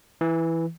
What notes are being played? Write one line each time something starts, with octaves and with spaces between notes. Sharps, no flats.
E3